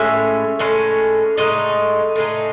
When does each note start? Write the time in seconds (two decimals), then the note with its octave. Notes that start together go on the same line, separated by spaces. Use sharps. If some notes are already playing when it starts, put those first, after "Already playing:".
Already playing: A2 G#3 C#4 E5
0.59 A2 G#3 C#4
1.38 A2 G#3 D#4 D#5
2.16 A2 G#3 D#4